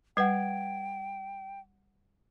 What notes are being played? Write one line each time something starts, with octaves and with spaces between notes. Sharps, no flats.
G3 B4 F#5 G5 G#6